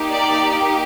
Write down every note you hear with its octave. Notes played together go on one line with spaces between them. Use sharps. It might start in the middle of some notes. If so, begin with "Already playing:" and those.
Already playing: A#3 D#4 G4
D5